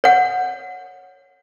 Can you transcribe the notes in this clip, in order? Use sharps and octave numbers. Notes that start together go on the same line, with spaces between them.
C#5 F#5